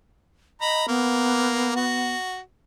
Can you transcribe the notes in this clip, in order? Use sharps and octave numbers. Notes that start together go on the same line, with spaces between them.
D#5 A#5 B5
A#3 B3
F#4